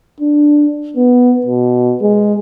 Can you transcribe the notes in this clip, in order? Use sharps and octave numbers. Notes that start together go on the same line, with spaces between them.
D4
B3
B2
G#3